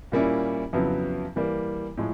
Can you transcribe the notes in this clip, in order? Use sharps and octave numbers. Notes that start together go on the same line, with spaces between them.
A#2 G3 A#3 C#4 E4
F2 C#3 F#3 B3 E4
E3 G3 A#3
A2 F3 G#3